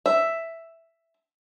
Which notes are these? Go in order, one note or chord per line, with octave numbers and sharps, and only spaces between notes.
E5